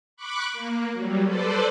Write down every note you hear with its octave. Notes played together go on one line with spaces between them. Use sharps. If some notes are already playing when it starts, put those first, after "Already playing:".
B5 C#6 D6 F#6
A#3
F#3 G3
A4 B4 C5 D5